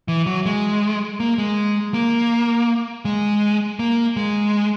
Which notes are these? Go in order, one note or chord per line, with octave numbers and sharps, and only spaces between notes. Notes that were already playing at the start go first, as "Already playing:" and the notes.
E3
F#3
G#3
A#3
G#3
A#3
G#3
A#3
G#3